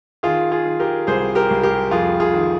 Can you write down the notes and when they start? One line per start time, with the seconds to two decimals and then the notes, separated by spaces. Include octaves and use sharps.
0.23 D#3 F4 G#4
0.52 F4 G#4
0.66 D#3
0.80 G4 A#4
1.07 C2 G#4 C5
1.35 G4 A#4
1.50 C2
1.63 G4 A#4
1.91 F2 F4 G#4
2.20 F4 G#4
2.34 D#3